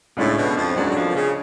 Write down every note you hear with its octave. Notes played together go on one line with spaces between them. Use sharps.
C#2 A2 C#3 G#3 D4
B2
D3
F2 F3
C#2 F#2 C#3 F#3 G#3 D4
D3
F2 F3
B2
C#3